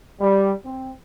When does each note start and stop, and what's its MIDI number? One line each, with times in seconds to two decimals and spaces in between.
0.20 0.51 55
0.63 0.90 60